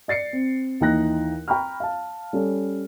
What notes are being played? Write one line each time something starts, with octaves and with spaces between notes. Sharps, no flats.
D5 A6 C7 C#7
C4
D#2 E3 D#4 G5 F#6 A#6
G5 A#5 B5 C#6 F6
F5 A5
G3 C#4 A4